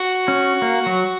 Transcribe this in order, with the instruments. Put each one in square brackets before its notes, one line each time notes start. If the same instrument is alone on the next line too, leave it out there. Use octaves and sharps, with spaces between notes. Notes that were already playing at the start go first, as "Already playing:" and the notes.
Already playing: [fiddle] F#4
[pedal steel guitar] C#4
A#3
F#3